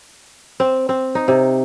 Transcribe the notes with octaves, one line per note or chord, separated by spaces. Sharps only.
C4
C4
D#4
C3